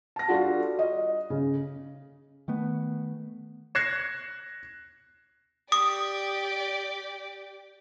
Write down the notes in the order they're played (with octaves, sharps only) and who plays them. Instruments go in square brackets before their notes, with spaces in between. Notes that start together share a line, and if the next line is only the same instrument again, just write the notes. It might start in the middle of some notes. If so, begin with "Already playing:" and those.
[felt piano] A5 A#6
G3 D4 F4 F#4 A4
D#5
C#3
[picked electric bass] D#3 A3 B3
[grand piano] F#6 G#6 A#6 C7 C#7 E7
[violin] G4 D5 [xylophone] D#6